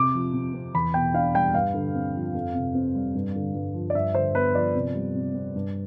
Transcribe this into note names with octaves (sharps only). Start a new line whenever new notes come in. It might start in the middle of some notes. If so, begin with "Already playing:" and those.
Already playing: C3 D6
F3
C3
C4
E2 B5
B2 G5
D4 F5
G3 G5
G2 F5
D3
C4
F3
F2
C3
C4
G3
G2
D3
G2
F3
D5
G2 E5
D3 C5
B3 B4
F3 D5
C3
G3
C3
C4
G2